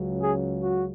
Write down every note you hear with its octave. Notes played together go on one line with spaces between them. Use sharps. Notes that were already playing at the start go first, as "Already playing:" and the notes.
Already playing: C#2 C#3 F#3
G#4
F#4